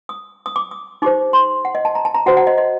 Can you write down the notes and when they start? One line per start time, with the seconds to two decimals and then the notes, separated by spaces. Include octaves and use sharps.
0.09 D#6
0.46 D#6
0.56 D6
0.71 D#6
1.02 D#4 G4 C5 D6
1.33 C6
1.65 F#5
1.75 D#5
1.85 A5
1.95 A#5
2.05 A5
2.15 A#5
2.26 F#4 C5 F#5
2.37 F#5
2.47 D#5
2.58 D#5